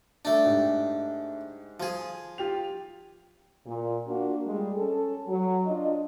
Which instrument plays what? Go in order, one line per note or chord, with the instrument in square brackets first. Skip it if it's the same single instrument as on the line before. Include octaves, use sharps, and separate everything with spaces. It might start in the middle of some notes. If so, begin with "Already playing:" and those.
[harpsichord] A3 D4
[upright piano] G#2 G4
[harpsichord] F3 G#4
[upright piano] F4 G4 F7
[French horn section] A#2
A#3 D4 F4 F#4
G3 G#3
C#4 A4
F#3
D4 F4 D#5